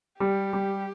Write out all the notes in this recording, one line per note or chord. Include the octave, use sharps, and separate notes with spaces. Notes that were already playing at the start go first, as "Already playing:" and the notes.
G3 G4
G3